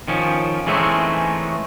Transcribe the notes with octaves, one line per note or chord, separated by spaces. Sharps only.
D#3 F3 C#4
E3 G#3 A3 C4 C#4 D#4